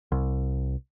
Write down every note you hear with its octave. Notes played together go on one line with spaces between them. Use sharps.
C2